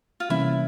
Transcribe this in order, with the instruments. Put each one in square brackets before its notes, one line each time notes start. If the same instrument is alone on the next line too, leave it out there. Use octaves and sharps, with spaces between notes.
[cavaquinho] F4
[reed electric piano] C3 E3 G3 A#3 C#4 [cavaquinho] E4